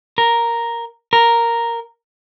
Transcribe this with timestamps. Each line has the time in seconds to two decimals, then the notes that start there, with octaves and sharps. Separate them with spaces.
0.18 A#4
1.13 A#4